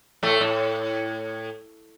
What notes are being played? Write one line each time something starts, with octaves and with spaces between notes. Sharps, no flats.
A2 A3
A2